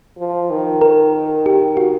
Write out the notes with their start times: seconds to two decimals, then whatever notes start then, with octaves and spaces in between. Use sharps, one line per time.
0.18 F3
0.50 D#3
0.81 A#4
1.46 G4
1.77 F#4